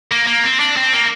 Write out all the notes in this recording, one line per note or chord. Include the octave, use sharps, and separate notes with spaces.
A#3
A#3
C4
D4
C4
A#3